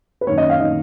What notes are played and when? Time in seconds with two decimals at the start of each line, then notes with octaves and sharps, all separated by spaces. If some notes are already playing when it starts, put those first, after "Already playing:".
0.21 B4
0.27 F#2 D#3 A#3 C#5
0.38 D#5
0.50 F5
0.60 D#3 A#3 D#5